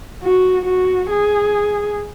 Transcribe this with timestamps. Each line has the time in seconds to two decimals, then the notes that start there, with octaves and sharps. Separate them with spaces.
0.23 F#4
0.65 F#4
1.10 G#4